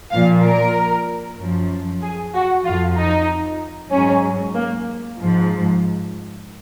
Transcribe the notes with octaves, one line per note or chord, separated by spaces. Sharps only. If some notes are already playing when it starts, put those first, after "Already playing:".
A#2 F3 F5
A#4
F#2 F3
G#4
F#4
F2 F3 F4
D#4
G#2 F#3 C#4
A#3
G#2 F3